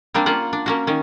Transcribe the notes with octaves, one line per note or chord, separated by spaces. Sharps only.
G3 A#3 C4 D4
A#3 C#4 F4 F#5
D4
A#3 C#4 F#4
D#3 C#4